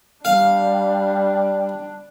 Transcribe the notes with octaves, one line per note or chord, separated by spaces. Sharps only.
G3 D4 F5